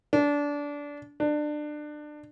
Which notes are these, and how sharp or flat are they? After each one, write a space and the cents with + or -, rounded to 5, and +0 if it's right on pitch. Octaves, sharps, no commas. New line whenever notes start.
D4 -20
D4 +25